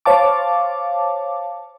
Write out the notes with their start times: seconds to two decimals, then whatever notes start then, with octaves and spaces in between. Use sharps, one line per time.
0.06 C5 C#5 F5 A5 D6